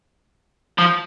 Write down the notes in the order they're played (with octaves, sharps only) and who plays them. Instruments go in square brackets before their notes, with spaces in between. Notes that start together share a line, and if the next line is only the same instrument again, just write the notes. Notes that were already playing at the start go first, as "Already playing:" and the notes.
[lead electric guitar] F3